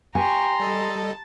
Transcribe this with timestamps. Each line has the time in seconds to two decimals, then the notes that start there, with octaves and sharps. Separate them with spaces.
0.15 G4 G#5 A#5 C6 C#6
0.60 G3 A4 D#5 A5